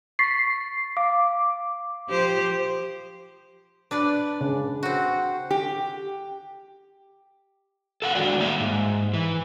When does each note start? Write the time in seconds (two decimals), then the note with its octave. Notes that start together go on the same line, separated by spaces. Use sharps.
0.19 C#6 A6 B6 C7
0.97 F5 D6
2.08 F3 G4 C5
3.91 D4 B4 D5
4.41 C#3
4.83 C4 F#4
5.51 G4
8.02 A4 F5 F#5
8.15 D3 D#3 F#3 G#3 F#4 D5
8.40 A#3 D#4 E5 F5
8.60 G#2
9.14 E3